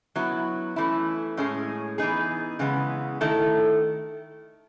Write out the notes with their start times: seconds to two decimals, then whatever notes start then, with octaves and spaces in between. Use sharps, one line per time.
0.16 F#3 B3 E4
0.76 E3 A3 C#4 E4
1.37 A2 G#3 C#4 G#4
1.98 E3 B3 D#4 G#4
2.59 C#3 E3 G#3 B3
3.21 D#3 A3 E4 A4